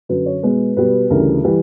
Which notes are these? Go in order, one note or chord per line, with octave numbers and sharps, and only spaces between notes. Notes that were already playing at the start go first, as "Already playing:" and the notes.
F#2 D3 F#3 B4
C#5
B2 G#3 B3 B4
B2 G3 B3 B4
D2 C#3 E3 G3 A#4
E3 G3 B4